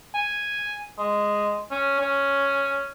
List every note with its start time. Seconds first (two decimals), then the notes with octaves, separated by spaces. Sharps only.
0.15 G#5
0.98 G#3
1.71 C#4
2.00 C#4